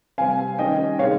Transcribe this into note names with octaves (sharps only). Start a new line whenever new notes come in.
C3 G3 C4 F5 G#5
D#3 G3 C#4 D#5 G5
C3 D#3 G#3 C#5 F5